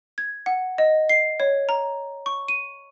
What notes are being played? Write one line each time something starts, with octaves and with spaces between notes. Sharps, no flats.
G#6
F#5
D#5
C7
C#5
A#5
C#6
D#7